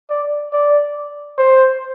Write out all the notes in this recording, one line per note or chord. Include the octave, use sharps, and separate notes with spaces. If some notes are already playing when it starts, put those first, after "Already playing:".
D5
D5
C5